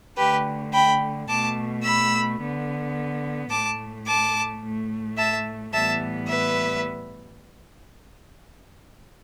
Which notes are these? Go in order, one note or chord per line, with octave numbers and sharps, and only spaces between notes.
D3 A3 G4 B4
G5 B5
B2 A3 A5 D6
B5 E6
D3 B3
A2 A3 A5 D6
A5 D6
A2 A3
E5 A5
A2 E3 G3 B3 E5 A5
B4 E5